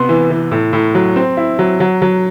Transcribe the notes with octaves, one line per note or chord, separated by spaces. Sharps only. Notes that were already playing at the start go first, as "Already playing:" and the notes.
Already playing: C3 B3 C6
E3
E3
A2
A2
F#3
C4
E4
F#3
F#3
F#3